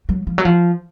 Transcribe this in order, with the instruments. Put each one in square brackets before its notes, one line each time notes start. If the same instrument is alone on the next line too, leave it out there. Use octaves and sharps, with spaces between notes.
[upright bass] F#3
F3
F#3
F3